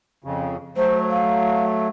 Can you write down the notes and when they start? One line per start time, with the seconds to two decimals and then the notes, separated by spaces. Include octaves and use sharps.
0.24 F2 C#3
0.77 F#3 A3 C5
1.10 F5